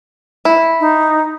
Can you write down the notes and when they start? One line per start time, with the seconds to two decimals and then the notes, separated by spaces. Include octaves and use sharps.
0.45 E4
0.80 D#4